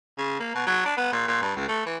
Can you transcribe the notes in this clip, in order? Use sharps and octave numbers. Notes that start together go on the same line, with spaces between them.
C#3
A#3
B2
F#3
D4
B3
A#2
A#2
G2
C#2
A3
E3